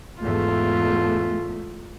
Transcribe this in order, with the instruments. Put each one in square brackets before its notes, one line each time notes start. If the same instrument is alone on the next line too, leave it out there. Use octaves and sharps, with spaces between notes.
[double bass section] E2 G#2 A3 [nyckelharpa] F4